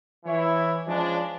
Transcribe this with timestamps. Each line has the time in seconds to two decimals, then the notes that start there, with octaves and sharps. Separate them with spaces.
0.25 E3 E4 C#5
0.88 F3 G#3 C#4 D4